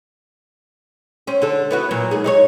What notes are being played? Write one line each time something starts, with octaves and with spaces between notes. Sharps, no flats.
C4 C#4
D3 A4
B3 E4 F#4
A#2 F#3
G#2 G#4
D#4 G#4 C#5